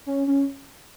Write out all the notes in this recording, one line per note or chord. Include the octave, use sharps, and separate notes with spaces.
C#4
C#4